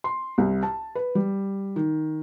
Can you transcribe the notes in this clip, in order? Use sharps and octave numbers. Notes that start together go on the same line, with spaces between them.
C6
C2
A5
B4
G3
D#3